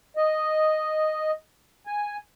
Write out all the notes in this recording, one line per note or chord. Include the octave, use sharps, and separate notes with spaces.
D#5
G#5